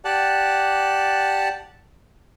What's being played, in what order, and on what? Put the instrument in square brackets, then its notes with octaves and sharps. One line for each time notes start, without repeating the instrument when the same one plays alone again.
[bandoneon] G4 D5 F#5 A5 F#6